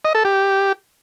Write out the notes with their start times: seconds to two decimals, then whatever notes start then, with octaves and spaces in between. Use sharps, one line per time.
0.05 D#5
0.15 A4
0.25 G4